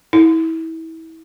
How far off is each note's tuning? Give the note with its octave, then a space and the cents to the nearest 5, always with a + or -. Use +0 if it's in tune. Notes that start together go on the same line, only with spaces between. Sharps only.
E4 -30